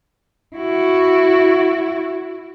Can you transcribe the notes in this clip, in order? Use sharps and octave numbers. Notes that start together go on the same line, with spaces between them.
E4 F#4